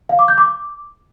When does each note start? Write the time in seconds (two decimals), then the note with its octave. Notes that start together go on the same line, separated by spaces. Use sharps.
0.09 F5
0.19 D6
0.28 G6
0.38 D6